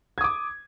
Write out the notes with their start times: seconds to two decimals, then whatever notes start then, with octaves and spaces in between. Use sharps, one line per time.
0.18 G#6
0.21 D#6
0.24 D6